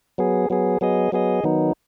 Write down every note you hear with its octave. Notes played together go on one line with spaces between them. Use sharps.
F#3 B3 G#4
F#3 B3 G#4
F#3 B3 G#4 D#5
F#3 B3 G#4 D#5
D#3 F#3 B3 D#4